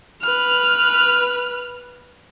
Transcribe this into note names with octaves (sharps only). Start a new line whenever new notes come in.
B4 F6